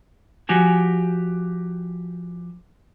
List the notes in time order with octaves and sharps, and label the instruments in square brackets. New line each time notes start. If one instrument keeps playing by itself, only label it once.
[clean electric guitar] F3 F#4 G4 G#5